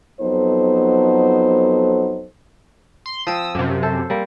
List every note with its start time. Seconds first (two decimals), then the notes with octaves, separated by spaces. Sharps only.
0.21 F2 F#3 B3 D#4 A4 C5
3.06 C6
3.27 F3 C4 D#6 E6
3.55 F#2 C3
3.83 A4 C5
4.10 G3 A#3